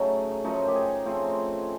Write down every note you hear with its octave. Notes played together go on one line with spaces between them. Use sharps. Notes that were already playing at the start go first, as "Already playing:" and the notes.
Already playing: C#3 F#3 A3 D#4
F#2 C#3 F3 A3 D#4
G4
G#4
C#3 F3 A3 C4